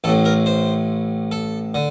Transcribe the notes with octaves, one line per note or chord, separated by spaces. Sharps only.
A1 A2 A4
A#4
C5
A4
D3